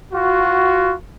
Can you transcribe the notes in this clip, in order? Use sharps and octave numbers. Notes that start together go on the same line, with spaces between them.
F4 F#4